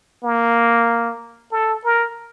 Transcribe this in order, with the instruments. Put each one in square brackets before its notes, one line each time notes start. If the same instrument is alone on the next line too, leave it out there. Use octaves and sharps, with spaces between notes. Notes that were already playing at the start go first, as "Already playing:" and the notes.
[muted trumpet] A#3
A4
A#4